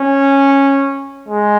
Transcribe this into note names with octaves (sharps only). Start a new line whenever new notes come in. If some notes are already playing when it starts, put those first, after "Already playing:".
Already playing: C#4
G#3